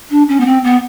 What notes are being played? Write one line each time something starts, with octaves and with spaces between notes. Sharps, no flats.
D4
C#4
B3
C4
B3